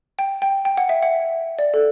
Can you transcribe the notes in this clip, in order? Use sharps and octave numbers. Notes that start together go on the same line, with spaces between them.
G5
G5
G5
F#5
E5
F#5
D5
A4